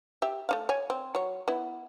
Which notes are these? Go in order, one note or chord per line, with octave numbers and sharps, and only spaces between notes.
G4 E5
A3 D#4 F5
C#5 G#5
C4
F#3 C#5
B3 E4